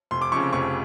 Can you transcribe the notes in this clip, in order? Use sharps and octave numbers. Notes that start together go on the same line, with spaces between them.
F1 C6
D6
F2 C#3 C#6
F1 C#6